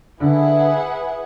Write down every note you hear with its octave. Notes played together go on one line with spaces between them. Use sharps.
D3 D4 E4 G#4 B4 F#5